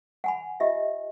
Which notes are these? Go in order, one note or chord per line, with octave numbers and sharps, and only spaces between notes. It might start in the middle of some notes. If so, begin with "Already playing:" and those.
F#5 G#5 B5
F4 G4 D#5 E5